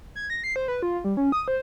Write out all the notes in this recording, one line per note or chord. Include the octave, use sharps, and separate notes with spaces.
G#6
A#6
C7
C5
B4
F4
G3
C#4
D#6
C5